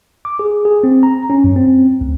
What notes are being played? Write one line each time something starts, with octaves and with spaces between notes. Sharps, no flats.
D6
G#4
G#4
C4
A#5
C#4
F#2
C4
D2